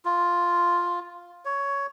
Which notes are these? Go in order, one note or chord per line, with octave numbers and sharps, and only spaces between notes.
F4
C#5